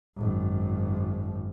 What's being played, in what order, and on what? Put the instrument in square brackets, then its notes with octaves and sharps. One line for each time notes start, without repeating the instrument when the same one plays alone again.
[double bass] G#1 F#2